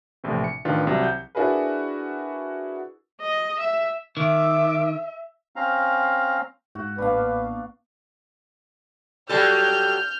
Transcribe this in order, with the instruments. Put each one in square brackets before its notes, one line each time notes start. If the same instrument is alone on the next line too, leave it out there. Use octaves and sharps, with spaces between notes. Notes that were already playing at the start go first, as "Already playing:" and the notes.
[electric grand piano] A#1 A2 C3 E3
C#7
A1 D#3 D4 F4 B4
C2 C3 F#3
G6
[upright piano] D4 E4 F#4 G#4 A#4 B4
[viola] D#5
E5
[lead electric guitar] D#3 [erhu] E5 [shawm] D6
[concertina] C4 C#4 F5 A#5
[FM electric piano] G#2 [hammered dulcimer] F#4
[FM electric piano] A1 F5 [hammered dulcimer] A#3 B3 D4 [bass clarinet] B4
[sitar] F#3 G3 A4 [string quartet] F6 G6